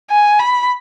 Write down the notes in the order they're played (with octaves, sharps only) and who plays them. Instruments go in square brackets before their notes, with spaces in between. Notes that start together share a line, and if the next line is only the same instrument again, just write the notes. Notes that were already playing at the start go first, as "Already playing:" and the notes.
[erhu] G#5
B5